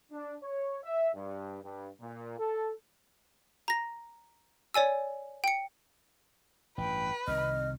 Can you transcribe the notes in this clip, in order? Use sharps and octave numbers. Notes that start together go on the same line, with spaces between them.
D4
C#5
E5
G2
G2
A#2
A4
A#5 A#6
C#5 D5 G#5 E6
G5 C#7
A1 G2 B4 G5
C2 C3 D#3 D#5 F6